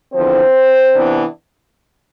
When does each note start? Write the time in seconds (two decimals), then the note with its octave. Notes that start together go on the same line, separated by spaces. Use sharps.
0.14 E2 D3 F3 C4 C5
0.95 C3 E3 B3 D4